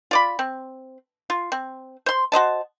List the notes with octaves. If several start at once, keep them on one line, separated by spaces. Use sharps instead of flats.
F4 D5 B5
C4
F4
C4
C5 C6
F#4 C5 D#5 A5